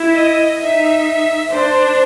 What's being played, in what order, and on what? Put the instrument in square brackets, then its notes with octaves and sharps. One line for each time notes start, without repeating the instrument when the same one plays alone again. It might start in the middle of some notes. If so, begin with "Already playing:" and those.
Already playing: [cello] E4
[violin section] D#5
[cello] D#4 [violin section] E5
[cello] D4 [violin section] C5